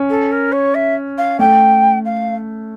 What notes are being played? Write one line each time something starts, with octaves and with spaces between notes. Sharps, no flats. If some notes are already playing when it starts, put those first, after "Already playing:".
Already playing: C#4
A4
A#4
C#5
E5
F5
A3 G5
F5